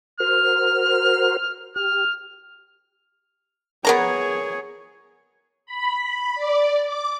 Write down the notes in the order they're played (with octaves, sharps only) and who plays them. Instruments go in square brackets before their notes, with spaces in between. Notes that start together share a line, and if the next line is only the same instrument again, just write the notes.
[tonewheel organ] F#4 A#4 C5 [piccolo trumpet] F6
[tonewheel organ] G4 [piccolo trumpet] F6
[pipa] B3 A#4 A#5 [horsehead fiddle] G#4 C#5
[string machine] B5
D5
D6